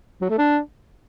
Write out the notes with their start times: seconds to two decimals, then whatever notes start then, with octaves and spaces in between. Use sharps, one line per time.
0.21 F#3
0.30 A3
0.38 D4